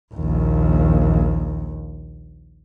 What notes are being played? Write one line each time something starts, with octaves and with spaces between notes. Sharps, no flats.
A#1 D#2